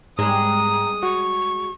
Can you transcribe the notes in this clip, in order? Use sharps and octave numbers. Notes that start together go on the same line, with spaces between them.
G#2 G3 G#3 A#5 D#6
F#4 C#6